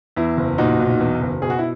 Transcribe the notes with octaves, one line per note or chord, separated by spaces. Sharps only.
E2 E4
F#1
A#2 D#4 F#4
B1
E2
F#1
B2 G#4
F#4
E4